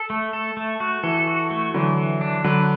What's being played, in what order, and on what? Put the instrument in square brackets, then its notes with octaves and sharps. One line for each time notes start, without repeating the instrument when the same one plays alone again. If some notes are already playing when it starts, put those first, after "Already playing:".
Already playing: [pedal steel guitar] A4
A3
A4
A3
F#4
[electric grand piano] E3 [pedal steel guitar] A4
[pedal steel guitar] F#4
A3
[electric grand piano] D3 F#3 [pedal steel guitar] E3
[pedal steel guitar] E3
D4
[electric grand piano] D3 F#3 [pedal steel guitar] B4